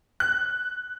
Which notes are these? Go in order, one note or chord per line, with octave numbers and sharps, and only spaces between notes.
F#6